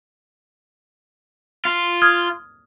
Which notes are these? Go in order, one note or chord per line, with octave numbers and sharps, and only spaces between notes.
F4
D#6 F6 G#6